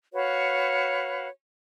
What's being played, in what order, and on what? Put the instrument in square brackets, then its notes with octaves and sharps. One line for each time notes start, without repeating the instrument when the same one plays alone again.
[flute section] F#4 B4 C#5 F5